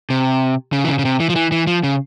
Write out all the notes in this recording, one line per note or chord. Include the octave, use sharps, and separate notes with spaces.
C3
C#3
E3
C#3
C#3
C3
E3
F3
E3
E3
F3
C#3